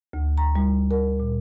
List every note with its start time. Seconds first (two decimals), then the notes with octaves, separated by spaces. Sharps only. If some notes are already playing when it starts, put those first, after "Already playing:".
0.13 D2
0.38 A#5
0.55 G3
0.91 A#4
1.20 A#2